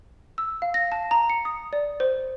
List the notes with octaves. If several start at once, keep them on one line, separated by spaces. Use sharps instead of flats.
E6
F5
A#6
A5
A#5
C#7
D#6
D5
C5